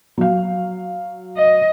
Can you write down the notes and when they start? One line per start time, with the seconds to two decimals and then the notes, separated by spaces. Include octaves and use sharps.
0.18 F#3 F5
1.37 D#5